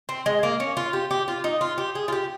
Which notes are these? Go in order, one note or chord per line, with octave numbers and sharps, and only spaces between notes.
C4
G#3
A#3
C#4
F4
G4
G4
F4
D#4
F4
G4
G#4
F4
G4